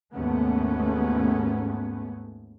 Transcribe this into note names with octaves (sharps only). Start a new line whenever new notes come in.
G#1 D#2 G#2 A3 B3 C#4